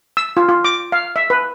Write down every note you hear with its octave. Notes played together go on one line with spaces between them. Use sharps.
E6
F4
F4
D6
F5
E5
B4